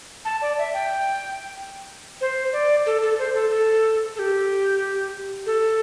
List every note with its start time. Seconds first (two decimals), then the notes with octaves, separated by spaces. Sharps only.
0.25 A5
0.41 D5
0.58 E5
0.73 G5
2.21 C5
2.53 D5
2.86 A4
3.02 A4
3.18 C5
3.34 A4
3.50 A4
4.16 A4
4.19 G4
5.46 A4